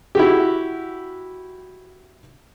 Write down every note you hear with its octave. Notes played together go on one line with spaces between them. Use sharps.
E4 F#4 G4